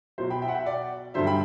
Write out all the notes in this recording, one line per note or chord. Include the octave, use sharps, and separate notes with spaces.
B2 F#3 C5
G5 B5
E5 G5
F#5
E5 G5
D5 F#5
G2 D3 F#3 C5 E5
G5 B5